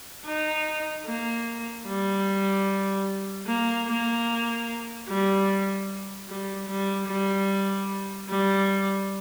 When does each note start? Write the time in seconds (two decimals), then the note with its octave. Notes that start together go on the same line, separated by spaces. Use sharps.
0.25 D#4
1.06 A#3
1.86 G3
3.47 A#3
3.87 A#3
5.08 G3
6.28 G3
6.68 G3
7.08 G3
8.29 G3